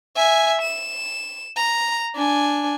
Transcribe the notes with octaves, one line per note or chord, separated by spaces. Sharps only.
E5 G#5
E7
A#5
D4 G#5